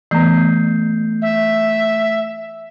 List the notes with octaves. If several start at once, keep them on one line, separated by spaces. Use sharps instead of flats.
E3 A3 B3 G6 C7
E5